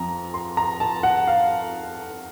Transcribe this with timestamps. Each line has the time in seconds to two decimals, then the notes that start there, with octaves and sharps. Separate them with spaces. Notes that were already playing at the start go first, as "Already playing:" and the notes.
Already playing: F2 F3 A#5
0.34 C6
0.57 A#5
0.80 A5
1.03 F#5
1.27 F5